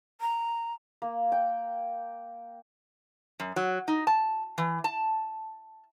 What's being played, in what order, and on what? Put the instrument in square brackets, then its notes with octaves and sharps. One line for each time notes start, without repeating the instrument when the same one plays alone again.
[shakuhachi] A#5
[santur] A#3
G5
[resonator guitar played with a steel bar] F#2
F#3
D#4
A5
E3
A5